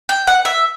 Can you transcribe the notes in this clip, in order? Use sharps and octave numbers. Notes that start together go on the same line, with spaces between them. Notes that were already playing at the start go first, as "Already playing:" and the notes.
G5
F#5
E5